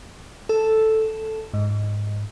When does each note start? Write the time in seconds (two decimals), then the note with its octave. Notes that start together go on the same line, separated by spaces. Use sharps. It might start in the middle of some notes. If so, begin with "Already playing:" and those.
0.49 A4
1.54 G#2